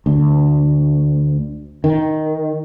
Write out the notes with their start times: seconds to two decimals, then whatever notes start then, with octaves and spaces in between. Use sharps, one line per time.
0.06 D2
1.84 D#3